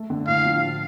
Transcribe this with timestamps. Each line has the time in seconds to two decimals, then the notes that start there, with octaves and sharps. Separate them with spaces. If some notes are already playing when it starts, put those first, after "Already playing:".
Already playing: A3
0.10 D3
0.27 A2 F5
0.45 F3
0.62 F4